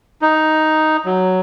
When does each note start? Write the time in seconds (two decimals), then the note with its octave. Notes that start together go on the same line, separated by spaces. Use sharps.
0.22 D#4
1.06 F#3